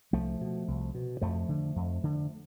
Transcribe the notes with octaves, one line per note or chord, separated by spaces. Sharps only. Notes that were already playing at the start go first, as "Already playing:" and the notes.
C2 F3 A3
B2
C2
B2
F2 F3 A3
D3
F2
D3